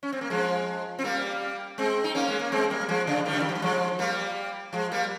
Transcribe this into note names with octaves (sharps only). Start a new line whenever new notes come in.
C#4
C4
A#3
F3 G#3
C4
G3 A#3
G#3 C4
D#4
A#3 C#4
G#3
A#3
G#3 C4
G3 A#3
G3
F3 G#3
C#3 F3
D#3 G3
C#3
D#3
F3
G3
F3 G#3
G3 A#3
F3 G#3
G3 A#3